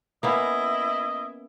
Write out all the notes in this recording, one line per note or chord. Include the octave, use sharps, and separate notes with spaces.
A#3 B3 C#4 E4 D#5